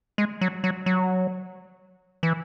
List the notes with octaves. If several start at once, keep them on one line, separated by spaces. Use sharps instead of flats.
G#3
F#3
F#3
F#3
E3